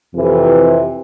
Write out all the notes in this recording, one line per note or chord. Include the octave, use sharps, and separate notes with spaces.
F2 C3 E3